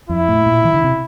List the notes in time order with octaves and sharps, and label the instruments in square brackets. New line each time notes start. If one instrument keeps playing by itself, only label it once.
[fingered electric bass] F2 [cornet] E4
[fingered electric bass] A2
A#2
E3
D3
C3